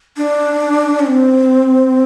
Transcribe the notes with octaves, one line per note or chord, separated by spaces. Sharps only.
D4
C#4
C4